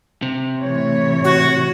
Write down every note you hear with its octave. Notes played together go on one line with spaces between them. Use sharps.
C3
A2 E3 C#5
F#4